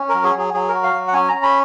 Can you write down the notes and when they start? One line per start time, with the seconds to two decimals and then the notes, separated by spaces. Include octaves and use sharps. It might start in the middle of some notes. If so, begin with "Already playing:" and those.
Already playing: C#4
0.09 A#4
0.14 F#3
0.24 G#4
0.34 F#3 G#4
0.54 F#3 G#4
0.69 A#4
0.74 F#4
0.83 F5
0.94 F#3
1.08 F#5
1.13 C#4 G#5
1.28 C#4 A#5
1.43 B5